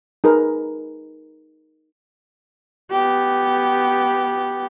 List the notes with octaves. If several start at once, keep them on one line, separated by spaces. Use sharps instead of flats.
D#4 G#4 A#4 B4
B3 G4